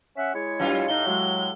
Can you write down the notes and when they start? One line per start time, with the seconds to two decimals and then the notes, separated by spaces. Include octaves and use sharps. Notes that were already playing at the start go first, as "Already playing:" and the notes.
0.17 C#4 E5 F#5
0.34 G#3 E4 C#5
0.60 F#2 G3 F4
0.89 A2 D#4 G7
1.06 F#3 G#3